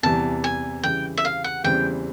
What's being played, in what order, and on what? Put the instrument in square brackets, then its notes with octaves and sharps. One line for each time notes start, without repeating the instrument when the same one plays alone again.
[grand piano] E2 C3 E3 G3 [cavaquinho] A5
[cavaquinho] G#5
[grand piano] C#3 E3 G3 [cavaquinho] G5
[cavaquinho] E5
F5
F#5
[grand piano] E2 C#3 E3 G3 C4 [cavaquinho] G5